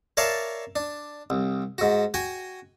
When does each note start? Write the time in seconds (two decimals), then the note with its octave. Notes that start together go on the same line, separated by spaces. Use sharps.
0.17 A#4 C#5 D5 E5 F5 A5
0.76 D4
1.30 C2
1.78 G#2 F#4
2.14 F#4 G5 G#5